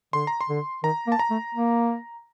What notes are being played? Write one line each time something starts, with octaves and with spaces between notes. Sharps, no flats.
D3 C6
A#5
C6
D3
D#3 A#5
A#3
A5
A#5
A3
A#3